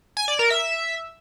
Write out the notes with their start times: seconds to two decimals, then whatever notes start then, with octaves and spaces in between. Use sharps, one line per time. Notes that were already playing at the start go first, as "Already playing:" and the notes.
0.17 G#5
0.28 D5
0.39 A#4
0.50 E5